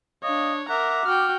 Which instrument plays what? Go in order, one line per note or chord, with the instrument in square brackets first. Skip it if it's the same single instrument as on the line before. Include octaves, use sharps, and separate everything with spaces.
[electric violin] D4 C#5 [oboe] D#5 [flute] F5
[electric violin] A#4 A#5 [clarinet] E5 [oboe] F#5 [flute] D6
[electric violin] F#4 G5 [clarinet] F6